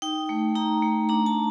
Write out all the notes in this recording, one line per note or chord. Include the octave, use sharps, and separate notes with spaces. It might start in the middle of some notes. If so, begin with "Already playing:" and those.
D#4 G5
A3
D#4 A#5
A3
D4 A#5
A5